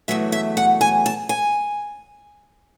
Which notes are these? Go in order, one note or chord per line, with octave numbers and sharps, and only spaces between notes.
E2 C#3 F#3 A3 E5
E5
F#5
G#5
A5
G#5